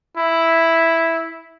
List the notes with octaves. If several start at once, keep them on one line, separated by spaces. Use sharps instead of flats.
E4